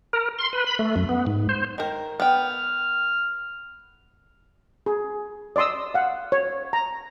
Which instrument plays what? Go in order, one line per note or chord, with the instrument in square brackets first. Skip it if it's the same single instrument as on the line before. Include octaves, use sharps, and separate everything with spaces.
[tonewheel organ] A#4
C6
B4
B5
A3
F#2
B3
G#2
C5
[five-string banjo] D#3 A#4
[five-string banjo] B3 G5 [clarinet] F6
[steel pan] G#4
D5 D#5 C6 D#6 E6
F5 F#5
C#5
A#5